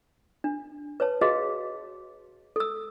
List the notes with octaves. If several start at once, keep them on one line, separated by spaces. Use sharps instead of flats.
D4
B4 C#5 A5
F#4 G#4 B4 D#5 F5
A4 E6